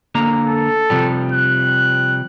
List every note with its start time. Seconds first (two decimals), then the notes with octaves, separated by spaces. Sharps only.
0.15 D3 A#3 A#5
0.48 A4
0.90 C3 F3 G3
1.32 F#6